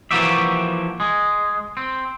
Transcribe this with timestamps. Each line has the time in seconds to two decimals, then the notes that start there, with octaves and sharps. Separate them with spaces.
0.11 E3 F3 A#3 F#4 G4 E5
1.00 G#3
1.77 C4